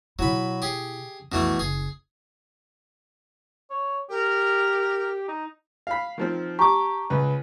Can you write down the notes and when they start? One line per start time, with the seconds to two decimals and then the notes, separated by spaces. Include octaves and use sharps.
0.19 B2 F#3 E4 B5
0.62 G4 G#4
1.32 B1 F2 B2 E3 A3
1.59 F#1 G#4
3.70 C#5
4.10 G4 A#4
5.28 D#4
5.87 F5 B5
6.18 D#3 F3 C4
6.59 G4 A5 A#5 C#6 D6
7.10 C#2 B4